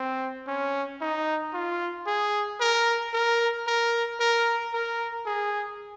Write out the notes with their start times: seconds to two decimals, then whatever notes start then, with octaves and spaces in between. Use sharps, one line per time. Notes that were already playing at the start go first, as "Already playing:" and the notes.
Already playing: C4
0.47 C#4
1.01 D#4
1.53 F4
2.07 G#4
2.60 A#4
3.13 A#4
3.67 A#4
4.19 A#4
4.73 A#4
5.26 G#4